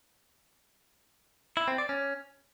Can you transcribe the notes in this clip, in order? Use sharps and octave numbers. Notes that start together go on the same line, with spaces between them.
E4
C4
D5
C#4